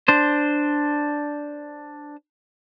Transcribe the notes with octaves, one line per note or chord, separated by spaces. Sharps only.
D4 C5